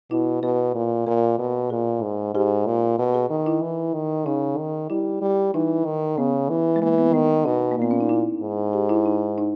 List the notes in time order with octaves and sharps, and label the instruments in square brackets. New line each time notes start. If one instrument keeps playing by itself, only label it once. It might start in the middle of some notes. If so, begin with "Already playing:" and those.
[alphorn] B2 [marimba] E4
[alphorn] B2 [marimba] B4
[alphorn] A#2
[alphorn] A#2 [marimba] A#4
[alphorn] B2
[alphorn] A#2 [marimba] G#4
[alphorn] G#2
[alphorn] G#2 [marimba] G4
[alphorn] A#2
B2
[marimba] G#4
[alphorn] D#3
[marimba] E4
[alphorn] E3
D#3
[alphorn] C#3 [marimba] D#4
[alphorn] D#3
[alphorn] G3 [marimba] E4
[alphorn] G3
[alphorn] E3 [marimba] D#4
[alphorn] D#3
[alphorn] C#3 [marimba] B3
[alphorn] E3
[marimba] G#3
[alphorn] E3 [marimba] A#3
[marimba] B3
[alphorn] D#3 [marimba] B3
[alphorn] B2 [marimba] D#4
[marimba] A#3
[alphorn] A#2 [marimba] B3
[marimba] C#4
D#4
E4
[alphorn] G#2
[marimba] G4
E4
D#4
D#4